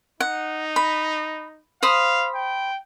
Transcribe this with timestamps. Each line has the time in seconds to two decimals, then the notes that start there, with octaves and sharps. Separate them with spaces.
0.20 D#4 F#5
0.76 B5
1.83 C5 F5 B5 D#6
2.35 G5